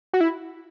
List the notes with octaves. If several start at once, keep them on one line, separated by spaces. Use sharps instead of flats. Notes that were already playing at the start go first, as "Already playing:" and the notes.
F#4
E4